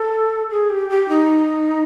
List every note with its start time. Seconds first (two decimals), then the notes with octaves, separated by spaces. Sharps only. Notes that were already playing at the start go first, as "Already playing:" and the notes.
Already playing: A4
0.50 G#4
0.70 G4
0.90 G4
1.09 D#4